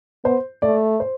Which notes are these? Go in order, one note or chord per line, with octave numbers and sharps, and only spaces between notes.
B3 C5
A3 D5
C5